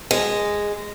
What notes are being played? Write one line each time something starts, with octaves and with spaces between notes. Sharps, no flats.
G#3